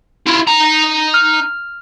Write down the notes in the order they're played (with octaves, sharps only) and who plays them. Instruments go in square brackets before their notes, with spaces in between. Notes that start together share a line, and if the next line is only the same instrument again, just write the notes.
[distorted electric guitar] E4 F4
D#4 A#5
[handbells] F6